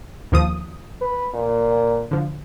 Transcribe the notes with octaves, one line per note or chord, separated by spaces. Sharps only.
D#2 F3 D#6
B4
A#2
D3 F3